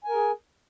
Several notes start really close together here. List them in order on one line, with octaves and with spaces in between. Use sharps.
G#5 A#4 G#4